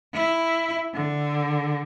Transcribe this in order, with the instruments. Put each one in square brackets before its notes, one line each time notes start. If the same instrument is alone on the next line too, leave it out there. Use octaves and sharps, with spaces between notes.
[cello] E4
D3